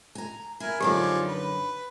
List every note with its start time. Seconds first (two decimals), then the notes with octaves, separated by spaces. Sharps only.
0.15 G#5 A#5
0.60 E4 A#4 G#5
0.80 F#2 D3 F3 D#4 G4 G#4 D5
1.28 B4